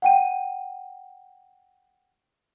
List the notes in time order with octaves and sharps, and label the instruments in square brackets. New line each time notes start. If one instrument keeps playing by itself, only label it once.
[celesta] F#5 G5 D#7